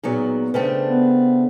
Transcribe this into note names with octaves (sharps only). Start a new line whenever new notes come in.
A#2 F#3 B3 D#4 G#4
C#3 A3 D4 B4 C5 G5
B3